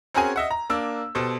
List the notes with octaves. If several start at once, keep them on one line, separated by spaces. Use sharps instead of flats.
C4 C#4 F#4 G#4 A#4 G#5
D#5 E5 F#5
A#5
A#3 D4 E6
B2 G4 A4 C5